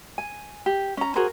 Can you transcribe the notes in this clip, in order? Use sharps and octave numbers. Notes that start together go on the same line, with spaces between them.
G#5
G4
C#4 A#5
F#4 G#4 A#4 C5